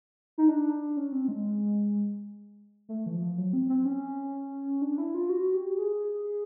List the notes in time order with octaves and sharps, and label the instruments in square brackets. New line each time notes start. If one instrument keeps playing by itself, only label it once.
[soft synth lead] D#4
D4
C#4
C4
G#3
A3
E3
F3
F#3
C4
C4
C#4
D4
E4
F4
F#4
G4
G#4